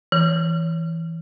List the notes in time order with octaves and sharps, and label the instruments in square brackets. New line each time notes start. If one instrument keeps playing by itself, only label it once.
[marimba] E3